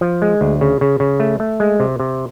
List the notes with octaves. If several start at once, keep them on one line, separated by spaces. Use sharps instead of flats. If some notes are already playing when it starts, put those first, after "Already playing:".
F3
G#3
D2
C#3
C#3
C#3
A3
A3
G#3
C3
C3